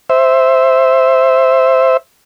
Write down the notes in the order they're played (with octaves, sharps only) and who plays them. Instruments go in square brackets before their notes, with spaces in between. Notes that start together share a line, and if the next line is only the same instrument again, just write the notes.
[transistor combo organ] C5 E5